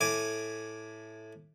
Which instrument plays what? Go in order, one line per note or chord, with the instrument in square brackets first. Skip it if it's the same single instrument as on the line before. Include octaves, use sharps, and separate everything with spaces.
[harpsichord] A2 G#5 D6